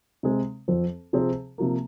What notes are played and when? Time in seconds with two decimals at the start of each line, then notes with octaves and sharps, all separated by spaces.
0.23 C3 G#3 C4
0.68 F2 F3 C4
1.13 C3 F3 C4 G#4 C5
1.58 C3 F3 A#3